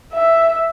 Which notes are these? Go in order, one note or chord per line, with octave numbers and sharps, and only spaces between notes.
E5